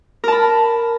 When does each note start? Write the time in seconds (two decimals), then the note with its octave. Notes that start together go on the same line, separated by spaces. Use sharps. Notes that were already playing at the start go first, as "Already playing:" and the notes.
0.24 A#4
0.28 A5
0.32 B5